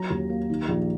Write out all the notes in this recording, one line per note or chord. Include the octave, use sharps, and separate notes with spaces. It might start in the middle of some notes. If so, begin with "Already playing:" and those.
Already playing: F#3 A#5
D#2
A#3
D#3
A#1